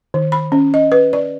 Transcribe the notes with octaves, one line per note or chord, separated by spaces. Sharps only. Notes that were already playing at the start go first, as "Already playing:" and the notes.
D#3
B5
C#4
D#5
B4
D5